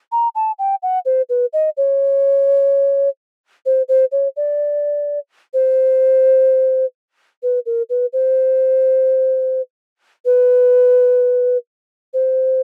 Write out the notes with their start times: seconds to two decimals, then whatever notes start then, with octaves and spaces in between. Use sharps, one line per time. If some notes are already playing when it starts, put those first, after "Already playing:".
0.12 A#5
0.35 A5
0.59 G5
0.83 F#5
1.05 C5
1.29 B4
1.53 D#5
1.77 C#5
3.66 C5
3.88 C5
4.12 C#5
4.36 D5
5.53 C5
7.43 B4
7.66 A#4
7.89 B4
8.13 C5
10.25 B4
12.13 C5